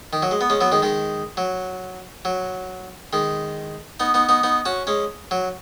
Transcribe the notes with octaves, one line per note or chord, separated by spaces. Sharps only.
D#3
F#3
G#3
B3
G#3 C#4
F#3 B3
D#3 G#3
D#3 G#3
F#3
F#3
D#3 G#3
B3 D#4
B3 D#4
B3 D#4
B3 D#4
C#4 F#4
G#3 C#4
F#3